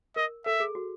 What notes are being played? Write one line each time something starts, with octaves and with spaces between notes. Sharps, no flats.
A#4 D#5
A4 E5
G#4
F#4